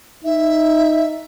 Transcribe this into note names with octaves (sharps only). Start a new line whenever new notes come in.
D#4 E5